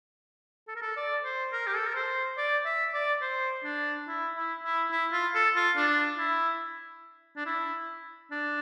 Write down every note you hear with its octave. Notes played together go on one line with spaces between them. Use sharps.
A4
A#4
A4
D5
C5
A#4
G4
A4
A#4
C5
D5
E5
D5
C5
D4
E4
E4
E4
E4
F4
A4
F4
D4
E4
D4
E4
D4